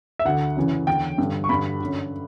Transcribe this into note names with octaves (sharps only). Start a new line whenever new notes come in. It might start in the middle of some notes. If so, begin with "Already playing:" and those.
E5
D2 D3 F#5
F#2 C#3 E3
E2 D3 G5
G2 D3
C#6
G2 D3 B5
F#2 D3